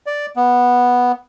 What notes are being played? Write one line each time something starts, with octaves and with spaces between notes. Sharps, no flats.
D5
B3